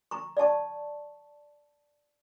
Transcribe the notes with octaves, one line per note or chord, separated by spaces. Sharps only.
A#5 C#6
D5 F5 A5 C#6